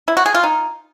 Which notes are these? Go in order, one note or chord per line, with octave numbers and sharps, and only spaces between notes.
E4
F#4
G#4
F4
D#4